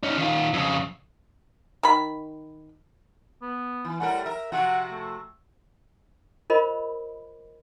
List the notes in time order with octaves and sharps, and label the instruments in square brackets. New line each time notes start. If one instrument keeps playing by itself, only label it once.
[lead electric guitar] C#4 D#4
D#3 F4
F2 C#3
[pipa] D#3 B5
[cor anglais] B3
[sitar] E3
[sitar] A2 G3 A#4 [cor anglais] F#5
[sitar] A#4 [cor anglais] E5
[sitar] C3 F3 F#4 [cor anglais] F#5
[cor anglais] A3
[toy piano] F4 A#4 C5 D#5 B5